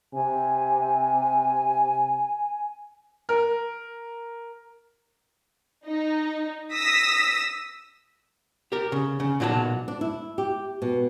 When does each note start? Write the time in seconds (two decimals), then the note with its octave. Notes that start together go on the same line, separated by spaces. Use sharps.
0.14 C3 G#5
3.29 A#4
5.86 D#4
6.72 D#6 E6 A#6 B6
8.72 G4 A#4
8.92 C#3
9.20 C#3
9.40 B1 A#2 F#3 A4 A5
9.88 D4
10.01 E4
10.38 G4
10.82 B2